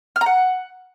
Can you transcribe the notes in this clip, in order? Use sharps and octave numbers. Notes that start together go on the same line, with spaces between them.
F6
A#5
F#5